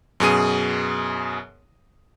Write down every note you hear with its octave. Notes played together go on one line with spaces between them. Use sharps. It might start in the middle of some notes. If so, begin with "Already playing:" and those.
F#2 B2 G#4 D#7